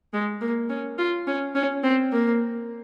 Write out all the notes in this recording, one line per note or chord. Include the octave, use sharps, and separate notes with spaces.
G#3
A#3
C#4
F4
C#4
C#4
C4
A#3